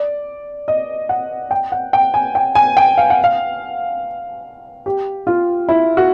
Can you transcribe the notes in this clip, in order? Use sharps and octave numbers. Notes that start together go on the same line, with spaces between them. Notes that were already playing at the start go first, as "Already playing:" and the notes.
Already playing: D5
D#5
F#5
G5
F#5
G5
G#5
G5
G#5
G5
F5
F#5
F5
G4
F4
E4
F#4